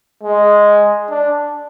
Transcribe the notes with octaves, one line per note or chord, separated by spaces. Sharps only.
G#3
D4